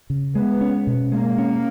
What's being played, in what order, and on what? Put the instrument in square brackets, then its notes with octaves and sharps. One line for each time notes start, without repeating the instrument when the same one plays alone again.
[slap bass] C#3
[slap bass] G#3 [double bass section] B3
[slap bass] C#4
B2
[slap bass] G#3 [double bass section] A#3
[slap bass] C#4